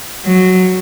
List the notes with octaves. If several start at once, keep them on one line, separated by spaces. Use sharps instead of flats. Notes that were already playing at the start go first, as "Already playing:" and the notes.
F#3